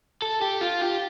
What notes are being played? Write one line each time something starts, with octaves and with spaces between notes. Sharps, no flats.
A4
G4
F4
G4